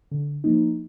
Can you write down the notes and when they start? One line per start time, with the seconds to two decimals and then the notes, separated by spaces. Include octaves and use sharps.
0.11 D3
0.44 F3 A#3 D#4